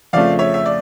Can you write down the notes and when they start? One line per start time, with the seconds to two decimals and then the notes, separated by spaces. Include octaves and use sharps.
0.13 F2 C#3 F3 A3 D5 F5
0.39 C#5 E5
0.54 E5
0.66 D5